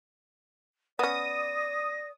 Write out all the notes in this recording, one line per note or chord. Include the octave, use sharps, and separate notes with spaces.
B3 C#4 D5 D#6 A#6